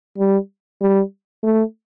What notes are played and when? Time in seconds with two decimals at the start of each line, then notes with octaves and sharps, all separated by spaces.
0.18 G3
0.81 G3
1.43 A3